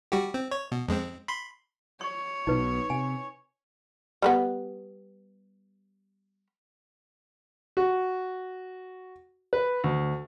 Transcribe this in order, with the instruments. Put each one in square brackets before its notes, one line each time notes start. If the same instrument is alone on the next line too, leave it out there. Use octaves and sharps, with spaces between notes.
[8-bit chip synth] G3 F#4 G4
C4
C#5
B2
F2 G#3 C4
B5 C6
[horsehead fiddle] C#5 [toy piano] C#6
[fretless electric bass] B1 B2 [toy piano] D#4 B4
[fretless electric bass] C3 [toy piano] G#5
[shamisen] G3 A3 B3
[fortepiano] F#4
B4
D2